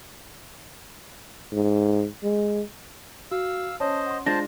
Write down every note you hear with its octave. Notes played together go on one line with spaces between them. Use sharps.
G#2
G#3
F#4 F5 E6
C#4 C5 D#5 A5
F#5 C6
G#3 D4 F4 C5 A5 A#6